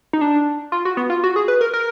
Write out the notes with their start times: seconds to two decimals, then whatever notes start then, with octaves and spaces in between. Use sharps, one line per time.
0.13 D#4
0.21 D4
0.72 F4
0.85 F#4
0.97 B3
1.10 F4
1.24 F#4
1.36 G#4
1.48 B4
1.61 A#4
1.73 A#4